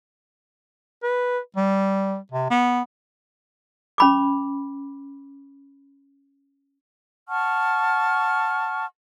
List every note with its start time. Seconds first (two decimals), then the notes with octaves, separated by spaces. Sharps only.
1.03 B4
1.56 G3
2.32 C3
2.50 B3
3.98 C#4 B5 D6
7.27 F#5 A5 C#6 F6